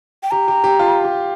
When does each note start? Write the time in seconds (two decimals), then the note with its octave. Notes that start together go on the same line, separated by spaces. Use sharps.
0.23 G5
0.31 G4 A#5
0.48 G4
0.64 G4
0.79 F4
1.04 G4